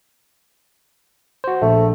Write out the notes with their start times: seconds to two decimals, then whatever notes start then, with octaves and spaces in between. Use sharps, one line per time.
1.44 F#4 C5
1.62 A#1 A3